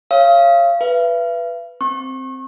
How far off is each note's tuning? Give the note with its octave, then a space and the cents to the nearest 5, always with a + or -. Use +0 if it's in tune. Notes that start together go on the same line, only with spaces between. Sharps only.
C#5 -10 F5 -25 D#6 +35
B4 +0 E5 +45
C4 +0 C#6 -35